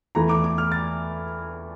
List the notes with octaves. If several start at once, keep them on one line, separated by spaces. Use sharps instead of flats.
E2 E3 A3 A#5
D6
D6
F6
A6